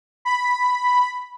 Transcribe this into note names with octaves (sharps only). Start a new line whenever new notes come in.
B5